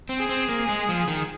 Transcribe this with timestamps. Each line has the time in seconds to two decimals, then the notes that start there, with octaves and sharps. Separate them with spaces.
0.09 C4
0.19 G#4
0.29 C4
0.49 A#3
0.69 G#3
0.89 F3
1.08 D#3